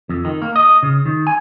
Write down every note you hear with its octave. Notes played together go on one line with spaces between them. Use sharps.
F2
D#3
A#3
D#5
C#3
D#3
G#5